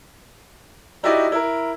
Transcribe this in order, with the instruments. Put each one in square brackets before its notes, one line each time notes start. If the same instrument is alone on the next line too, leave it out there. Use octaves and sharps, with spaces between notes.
[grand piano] D#4 E4 F#4 G4 D5 D#5
E4 A#4